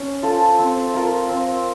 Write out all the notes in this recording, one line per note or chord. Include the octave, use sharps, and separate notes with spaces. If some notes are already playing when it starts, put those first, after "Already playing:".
Already playing: C#4
F4 A4 C5
C4
F4 A#4
C4